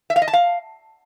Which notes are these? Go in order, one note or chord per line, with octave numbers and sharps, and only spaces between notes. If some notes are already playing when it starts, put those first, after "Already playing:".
E5
F5
D#5
A5
F5